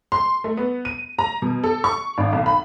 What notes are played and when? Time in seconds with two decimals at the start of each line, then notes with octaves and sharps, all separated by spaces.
0.12 C6
0.44 A3
0.57 B3
0.85 D#7
1.19 A#5
1.42 B2
1.63 A4
1.84 C#6
2.18 G#1
2.33 B1
2.46 B5